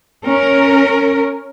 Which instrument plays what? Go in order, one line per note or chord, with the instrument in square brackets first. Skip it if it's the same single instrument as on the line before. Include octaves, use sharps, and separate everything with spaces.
[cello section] C#4 A#4